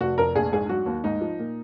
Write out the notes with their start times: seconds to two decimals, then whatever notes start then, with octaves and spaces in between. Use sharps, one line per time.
0.01 F1 F#4
0.18 F2 A#4
0.35 A#1 G#4
0.52 G#2 G#4
0.69 F#3 F#4
0.86 D#2
1.04 G#2 D#4
1.21 F3
1.39 A#2